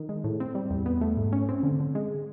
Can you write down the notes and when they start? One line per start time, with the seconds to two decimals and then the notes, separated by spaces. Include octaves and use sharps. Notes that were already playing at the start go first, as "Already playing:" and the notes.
Already playing: D#3
0.09 G#3
0.24 A2
0.40 C4
0.55 G3
0.70 E2
0.86 B3
1.01 A3
1.17 G#2
1.33 C#4
1.49 C4
1.63 D3
1.80 D3
1.95 G#3